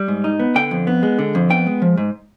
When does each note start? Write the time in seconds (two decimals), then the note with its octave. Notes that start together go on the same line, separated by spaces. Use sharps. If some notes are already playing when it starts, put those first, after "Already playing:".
Already playing: G3
0.08 G#2
0.24 D#4
0.40 B3
0.55 D3 G5
0.71 F2
0.87 B3
1.03 G#3
1.19 D3
1.35 F2
1.50 B3 G5
1.66 G#3
1.82 F3
1.97 G#2